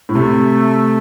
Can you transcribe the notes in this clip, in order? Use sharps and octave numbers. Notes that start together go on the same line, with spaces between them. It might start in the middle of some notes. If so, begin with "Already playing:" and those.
A2
C3 A3